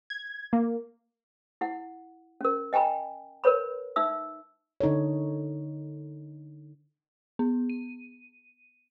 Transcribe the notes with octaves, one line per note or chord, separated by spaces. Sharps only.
G#6
A#3
E4 F#5
C#4 A#4
D#5 G5 G#5 A#5 B5
A#4 B4 C#5 B5
D#4 E5 E6
D3 D#4 A4 C#5
B3
D#7